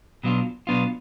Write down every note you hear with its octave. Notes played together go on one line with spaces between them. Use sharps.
B2 F#3 B3 D4 F4
B2 F#3 B3 D4 F4